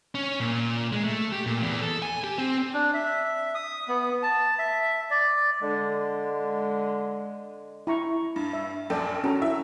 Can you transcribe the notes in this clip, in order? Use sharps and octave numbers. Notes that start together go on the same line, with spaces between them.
C#4
A#2
G#3
A3
G4
A#2
E2
A4
G#5
G4
C4
D4
E5
D#6
B3
A5
E5
D5
D3 G#3
E4 A#5 C#6
G2
E5
A#1 F#2 A4 D5 G5
C#4 F#4 A4 A#5
E4 E5